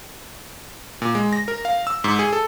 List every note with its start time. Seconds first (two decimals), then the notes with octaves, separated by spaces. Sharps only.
1.02 A#2
1.15 G#3
1.33 A#6
1.48 A#4
1.65 F5
1.87 E6
2.04 G#2
2.19 G#4
2.33 A4